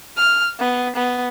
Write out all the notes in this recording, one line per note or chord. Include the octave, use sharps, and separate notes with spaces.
F6
B3
B3